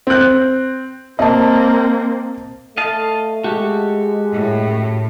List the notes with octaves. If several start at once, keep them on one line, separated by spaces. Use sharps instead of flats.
C4 F#6
A#3 C4 D#5 A5
A3 D#5 F5 A5
G#3 F#4 G4 A4
F#2 A2 E4